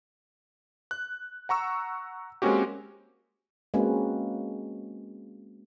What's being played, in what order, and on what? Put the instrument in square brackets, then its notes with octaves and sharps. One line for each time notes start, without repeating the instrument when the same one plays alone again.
[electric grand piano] F#6
F#5 A#5 C#6 E6
G#3 A#3 C4 C#4 F#4 G4
[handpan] G#3 A#3 C4 C#4 F#4 B4